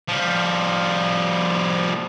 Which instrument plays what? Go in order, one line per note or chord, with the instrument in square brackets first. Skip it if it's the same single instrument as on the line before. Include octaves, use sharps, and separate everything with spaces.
[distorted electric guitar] F3 G3